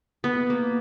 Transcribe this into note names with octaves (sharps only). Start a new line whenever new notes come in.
B3
A#3